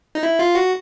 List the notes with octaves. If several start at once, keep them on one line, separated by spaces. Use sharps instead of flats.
D#4
E4
F4
F#4